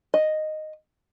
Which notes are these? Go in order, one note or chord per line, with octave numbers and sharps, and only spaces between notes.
D#5